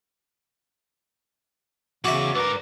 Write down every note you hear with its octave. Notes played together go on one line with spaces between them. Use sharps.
B1 E2 C#3 F#4 E5 D6
G2 A#4 B4 D6